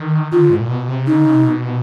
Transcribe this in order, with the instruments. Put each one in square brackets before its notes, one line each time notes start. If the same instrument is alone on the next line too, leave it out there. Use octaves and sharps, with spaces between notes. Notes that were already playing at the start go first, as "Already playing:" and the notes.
Already playing: [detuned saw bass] D#3
[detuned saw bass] D#3 [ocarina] F4
[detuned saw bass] D3
G#2
A#2
B2
C3
[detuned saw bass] C#3 [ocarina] D#4
[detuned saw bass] D3
C#3
C3
B2